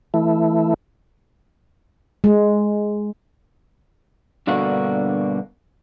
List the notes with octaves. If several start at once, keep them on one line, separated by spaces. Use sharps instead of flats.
E3 A3 E4
G#3
G2 B2 D3 A#3 F#4